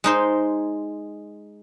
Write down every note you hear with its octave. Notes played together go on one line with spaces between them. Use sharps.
G#3 D#4 C5